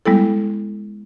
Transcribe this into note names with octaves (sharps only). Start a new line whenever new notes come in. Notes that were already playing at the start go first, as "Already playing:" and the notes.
G3 G#3 B3 E4 A4